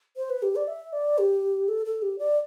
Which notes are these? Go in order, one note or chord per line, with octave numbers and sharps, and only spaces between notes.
C5
B4
G4
D5
E5
D5
G4
A4
A4
G4
D5